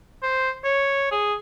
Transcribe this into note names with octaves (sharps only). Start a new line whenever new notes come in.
C5
C#5
G#4